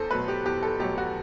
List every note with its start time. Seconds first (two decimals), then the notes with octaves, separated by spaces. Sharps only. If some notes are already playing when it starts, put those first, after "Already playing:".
Already playing: E2 A4 C5
0.11 B2 F#3 A3 B4
0.28 G4
0.45 E2 G4
0.63 A4
0.79 B2 F#3 A3 G4
0.98 F#4